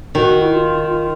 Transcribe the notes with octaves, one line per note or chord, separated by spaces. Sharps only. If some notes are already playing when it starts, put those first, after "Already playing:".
D#3 F#4
E4
F4
F4